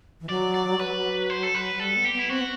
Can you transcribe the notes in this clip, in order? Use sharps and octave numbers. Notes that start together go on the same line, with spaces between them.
E3
F#3 D5
D5
F#3 B4
C5
A4
B4
F#3
G3 A4
B3
G4
B3
E4
C4 F#4
B3